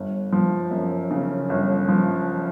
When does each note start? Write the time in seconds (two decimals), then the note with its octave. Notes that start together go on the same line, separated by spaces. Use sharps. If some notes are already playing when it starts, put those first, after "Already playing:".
Already playing: G1
0.33 F3
0.71 F#2
1.11 C#3
1.49 G1
1.89 F3